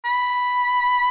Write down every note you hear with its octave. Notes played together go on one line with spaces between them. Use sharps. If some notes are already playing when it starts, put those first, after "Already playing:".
B5